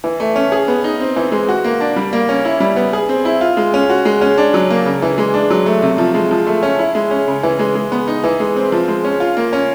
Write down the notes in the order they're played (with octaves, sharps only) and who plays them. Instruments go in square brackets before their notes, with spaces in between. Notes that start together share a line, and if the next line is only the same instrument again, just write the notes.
[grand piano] E3
A3
C#4
G#4
B3
D#4
C4
E3
G#3
F#4
A#3
D4
G3
A#3
C#4
E4
G3
B3
G#4
C4
E4
F4
G#3
C#4
F#4
G#3
C#4
D4
F#3
A#3
C#3
E3
G#3
D4
F#3
A3
C3
F3
G#3
F3
A3
C#4
E4
G#3
C#4
C#3
E3
G#3
G#3
B3
D#4
E3
G#3
C4
F3
G#3
C#4
F4
A#3
C#4